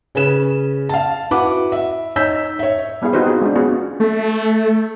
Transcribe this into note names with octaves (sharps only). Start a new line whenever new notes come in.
C#3 C#4 B4 E7
F5 A5
E4 F#4 B4 F#5 D6
E5
D#4 C#5 E6 G6 B6
C#5 E5
G3 B3 E4 G#4 F5
C4 D#4 F#4 B4 C5
B3 F4 G#4
G#3 D4
B3 C#4 F4 F#4 G#4
A3